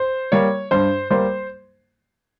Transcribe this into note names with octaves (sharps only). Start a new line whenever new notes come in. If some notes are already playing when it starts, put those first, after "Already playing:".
Already playing: C5
G3 A#3 C#5
G2 C5
G3 A#3 C5